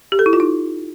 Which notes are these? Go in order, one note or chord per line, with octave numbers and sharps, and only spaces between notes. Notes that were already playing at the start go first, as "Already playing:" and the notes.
G4
A4
E4
F4
D#4